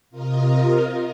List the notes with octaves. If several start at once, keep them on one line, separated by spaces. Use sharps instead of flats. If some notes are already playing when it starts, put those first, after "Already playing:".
C3 F4 A#4 D#5